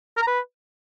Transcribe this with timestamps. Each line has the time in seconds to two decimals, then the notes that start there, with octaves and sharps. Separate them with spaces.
0.17 A#4
0.22 A#5
0.27 B4